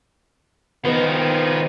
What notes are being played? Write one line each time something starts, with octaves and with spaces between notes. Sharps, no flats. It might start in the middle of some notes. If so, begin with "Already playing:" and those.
D#3 F3 B3 D#4